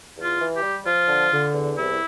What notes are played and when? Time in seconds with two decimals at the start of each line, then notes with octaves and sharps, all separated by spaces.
0.15 E2
0.22 F4
0.39 E3
0.54 G4
0.62 G3
0.85 F3 F4
1.07 D3
1.31 D3
1.54 E2
1.77 C2 E4